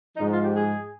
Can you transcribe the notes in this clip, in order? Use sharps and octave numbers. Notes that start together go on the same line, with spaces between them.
G#2 F3 D#4
F4
G4
G#4